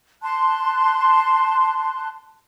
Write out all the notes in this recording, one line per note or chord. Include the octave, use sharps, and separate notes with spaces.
A5 C6 F#6